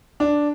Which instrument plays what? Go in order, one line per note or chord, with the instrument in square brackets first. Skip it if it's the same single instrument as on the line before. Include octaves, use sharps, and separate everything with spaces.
[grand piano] D4